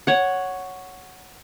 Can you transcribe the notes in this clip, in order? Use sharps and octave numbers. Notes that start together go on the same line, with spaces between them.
C#5 F#5